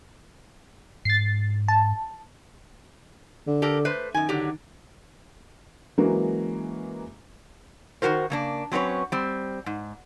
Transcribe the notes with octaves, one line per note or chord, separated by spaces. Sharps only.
G#2 A6 C7
A5
D3
G4 A4 A#4
A3 B4 C5
F#2 D#3 G#5
D3 F#3 G4
E3 F#3 G#3 A#3 C#4 F#4
D#3 F3 F#4 A#4 C5
C#3 A#3 D4
F#3 C4 C#4 B4 C#5
G3 C4
G#2